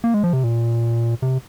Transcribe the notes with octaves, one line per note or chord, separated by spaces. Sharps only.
A#3
G#3
F3
C3
A#2
C3